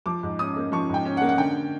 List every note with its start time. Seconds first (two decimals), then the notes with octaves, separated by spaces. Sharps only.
0.06 F3 D6
0.23 G#2
0.39 C#4 D#6
0.56 A#3
0.72 F3 C#6
0.89 G#2 G5
1.05 C#4
1.17 F#5
1.22 A#3
1.29 F#5
1.38 D3 G5